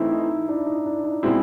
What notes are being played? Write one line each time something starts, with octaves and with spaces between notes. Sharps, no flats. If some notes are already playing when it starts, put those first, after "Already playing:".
Already playing: E3 A3 C4 D#4 E4
D#4
D4 E4
D#4
D4
D#4
B2 G#3 C4 E4